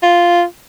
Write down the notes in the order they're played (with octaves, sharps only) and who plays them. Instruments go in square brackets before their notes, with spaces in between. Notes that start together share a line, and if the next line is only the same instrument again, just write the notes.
[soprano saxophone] F4